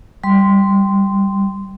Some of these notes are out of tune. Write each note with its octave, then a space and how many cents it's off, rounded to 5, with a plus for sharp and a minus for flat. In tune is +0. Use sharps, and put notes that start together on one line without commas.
G3 +0 C6 -10